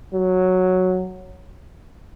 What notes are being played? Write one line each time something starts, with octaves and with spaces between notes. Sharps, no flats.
F#3